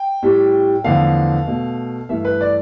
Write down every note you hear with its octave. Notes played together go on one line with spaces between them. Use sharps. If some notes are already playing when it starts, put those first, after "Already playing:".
Already playing: G5
A2 G3
E2 D3 F3 A3 F5
B2 A3
G2 E3 A3 E5
B4
D5